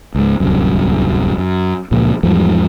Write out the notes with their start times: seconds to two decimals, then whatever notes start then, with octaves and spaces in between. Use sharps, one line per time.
0.15 C#2 G#2
0.40 D1 C2 F#2
1.38 F#2
1.91 C#2 A#2 F3
2.23 E2 G#2 F3 G3